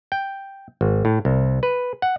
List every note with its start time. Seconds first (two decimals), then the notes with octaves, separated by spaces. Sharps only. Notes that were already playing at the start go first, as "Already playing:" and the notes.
0.12 G5
0.81 G#1
1.05 A2
1.25 C2
1.63 B4
2.02 F#5